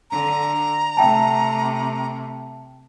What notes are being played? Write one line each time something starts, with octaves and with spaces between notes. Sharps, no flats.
D3 A#5
C3 A3 E5 G5 A5